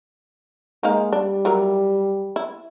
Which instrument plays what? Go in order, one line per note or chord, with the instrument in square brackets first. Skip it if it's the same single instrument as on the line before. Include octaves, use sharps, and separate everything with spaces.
[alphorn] G#3 [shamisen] A#3 D#4 F5
[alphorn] G3 [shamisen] D4
[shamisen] E3 F#3 A#4
E4